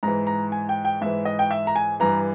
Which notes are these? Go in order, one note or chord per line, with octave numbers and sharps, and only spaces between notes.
G#2 E3 A#5
A#5
G#5
G5
G5
G#2 E3 E5
D#5
G5
E5
A#5
G#5
G2 E3 A#5